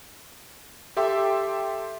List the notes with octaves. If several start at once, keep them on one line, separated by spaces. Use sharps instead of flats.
G4 A4 E5 G5 C6 D6